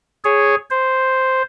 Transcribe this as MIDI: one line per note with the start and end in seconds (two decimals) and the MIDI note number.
0.25 0.55 68
0.25 0.55 73
0.70 1.42 72